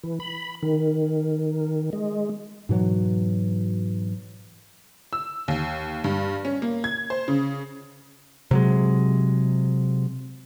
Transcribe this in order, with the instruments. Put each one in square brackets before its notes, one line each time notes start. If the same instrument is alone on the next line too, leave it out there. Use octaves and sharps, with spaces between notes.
[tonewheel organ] E3
B5
D#3
G#3
[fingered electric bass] G#2 B2 E3 F#3
[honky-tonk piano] E6
D#2
G2
C#4
A#3
G#6
C5
C#3
[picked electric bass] C3 F#3 G#3